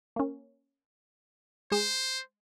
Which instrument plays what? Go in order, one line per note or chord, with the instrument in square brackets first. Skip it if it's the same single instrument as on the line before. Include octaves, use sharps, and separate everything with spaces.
[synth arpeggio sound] A#3 C#4
[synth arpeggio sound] G#3 G#4 E7 [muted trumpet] C5